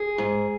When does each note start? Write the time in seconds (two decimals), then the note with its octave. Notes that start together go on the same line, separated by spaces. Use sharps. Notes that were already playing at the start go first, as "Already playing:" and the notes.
Already playing: G#4
0.18 G#2